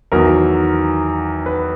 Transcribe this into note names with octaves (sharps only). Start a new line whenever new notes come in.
E2 D#3 F#3 A#4
B4